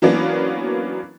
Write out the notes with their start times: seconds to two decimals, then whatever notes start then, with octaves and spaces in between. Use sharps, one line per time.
0.02 E3 F#3 A#3 B3 C#4 D4